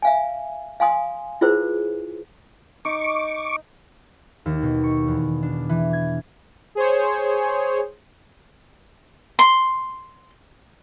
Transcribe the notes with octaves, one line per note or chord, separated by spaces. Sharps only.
E5 F5 G#5
F5 G#5 C6 D#6
E4 F4 G#4 B4 C5
D#4 C#6 D6
D#2
B2
C#6
E2
D4
E3
G#6
G#4 C5 C#5
C6